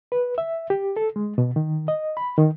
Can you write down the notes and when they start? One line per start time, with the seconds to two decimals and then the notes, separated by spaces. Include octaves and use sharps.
0.12 B4
0.38 E5
0.70 G4
0.97 A4
1.16 G#3
1.38 B2
1.56 D#3
1.88 D#5
2.17 B5
2.38 D#3